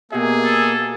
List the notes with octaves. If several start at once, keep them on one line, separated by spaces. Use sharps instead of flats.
B2 A#3 G4 G#4 E5
A4